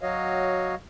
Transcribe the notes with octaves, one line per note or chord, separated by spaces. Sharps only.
F#3 F#4 C#5 D#5 F5